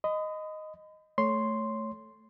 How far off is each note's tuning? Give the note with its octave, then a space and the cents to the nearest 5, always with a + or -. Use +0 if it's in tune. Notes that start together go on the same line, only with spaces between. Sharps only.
D#5 +0 B5 +40
A3 +0 C#5 +0 C6 +0